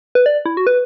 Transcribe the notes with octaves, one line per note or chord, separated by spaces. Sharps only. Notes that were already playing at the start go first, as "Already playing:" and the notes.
B4
D5
E4
F#4
B4